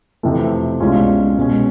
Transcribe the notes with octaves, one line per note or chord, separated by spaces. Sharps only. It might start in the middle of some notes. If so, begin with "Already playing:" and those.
F2 C3 E3 A3
C2 B2 G#3 C#4 F4
B2 G#3 C#4